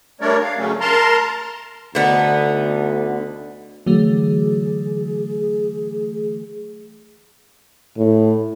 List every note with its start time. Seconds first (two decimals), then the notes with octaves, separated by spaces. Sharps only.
0.21 G3 A3 D4 A#4 C#5 D5
0.43 F5
0.57 C#3 F#3 A3 C#4
0.81 A#4 A5 A#5 C6
1.95 D2 D3 B3 D#4
3.86 D3 E3 F#3 A3 G#4
7.97 A2